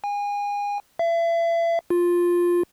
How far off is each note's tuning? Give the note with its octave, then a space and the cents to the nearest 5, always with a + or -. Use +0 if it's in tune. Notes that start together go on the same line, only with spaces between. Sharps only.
G#5 -30
E5 +35
F4 +5